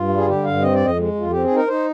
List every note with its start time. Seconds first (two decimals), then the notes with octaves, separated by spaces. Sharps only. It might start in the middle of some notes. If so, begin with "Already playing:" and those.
Already playing: G2 F4
0.08 G3
0.17 G#4
0.26 D3 G4
0.44 G2 F5
0.62 C4 D#5
0.74 D5
0.80 F2
0.85 D#5
0.97 G#3
1.15 F2 F4
1.31 C4 G4
1.43 G#4
1.51 D#4
1.56 A#4
1.67 D#4 C5